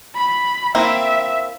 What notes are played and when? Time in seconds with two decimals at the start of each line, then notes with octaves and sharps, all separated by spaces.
0.15 B5
0.75 A#3 C4 E4 E5